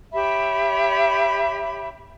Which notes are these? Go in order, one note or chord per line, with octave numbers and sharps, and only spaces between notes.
G4 C#5 E5 B5